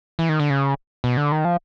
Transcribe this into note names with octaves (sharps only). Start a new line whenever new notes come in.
E3
D#3
D3
C#3
B2
D3
D#3
F3